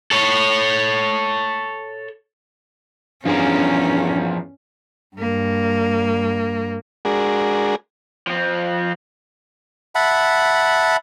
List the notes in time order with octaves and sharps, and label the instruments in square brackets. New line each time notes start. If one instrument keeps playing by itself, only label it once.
[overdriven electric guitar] A4 C#5
[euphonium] E2 [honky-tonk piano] G2 [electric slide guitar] F3 G#4 A#4 [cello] C#4
[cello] G2 A#3
[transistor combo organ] G#3 D4 F#4 G#4 A#4
[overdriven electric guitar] F3 C4
[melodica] E5 F#5 A5 B5